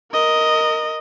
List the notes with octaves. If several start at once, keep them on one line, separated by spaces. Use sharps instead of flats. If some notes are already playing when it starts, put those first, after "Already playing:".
A#4 D#5